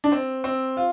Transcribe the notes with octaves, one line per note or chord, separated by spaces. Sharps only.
D4
C4
C4
F4